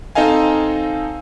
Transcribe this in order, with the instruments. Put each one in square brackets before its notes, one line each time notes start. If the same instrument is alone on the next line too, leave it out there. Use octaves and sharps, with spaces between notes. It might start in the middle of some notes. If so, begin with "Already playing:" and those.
[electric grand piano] C4 D#4 A4 D#5 F5 G#5